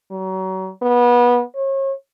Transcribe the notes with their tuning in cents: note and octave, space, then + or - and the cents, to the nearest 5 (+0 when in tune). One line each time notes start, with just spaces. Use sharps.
F#3 +35
B3 -25
C#5 -35